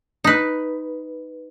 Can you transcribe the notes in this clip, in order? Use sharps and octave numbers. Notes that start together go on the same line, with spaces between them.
D#4 B4